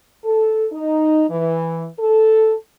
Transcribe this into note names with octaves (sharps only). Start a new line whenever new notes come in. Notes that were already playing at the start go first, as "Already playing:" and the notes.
A4
D#4
E3
A4